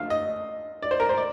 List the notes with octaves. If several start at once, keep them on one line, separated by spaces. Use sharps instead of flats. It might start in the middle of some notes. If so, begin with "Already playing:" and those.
Already playing: D3 F3 A3 F5
D#5
D5
C5
A#4
C5
D5